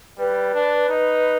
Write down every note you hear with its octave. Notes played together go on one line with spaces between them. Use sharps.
G3 B4
D4
D#4